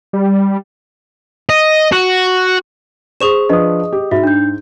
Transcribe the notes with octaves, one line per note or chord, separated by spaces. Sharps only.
G3
D#5
F#4
G#4 C5 C#6 D#6 E7
F3 D4 B4 D#5 D#6
G4
G#2 F#4 E5
D4 G6